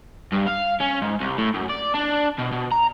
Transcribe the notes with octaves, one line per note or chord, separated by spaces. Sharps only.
G2
F5
C#4
G#2
C2
A2
F#2
D5
D4
B2
B2
A#5